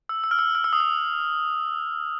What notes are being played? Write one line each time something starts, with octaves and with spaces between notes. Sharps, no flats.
E6
E6
F6
E6
F6
E6
D#6
E6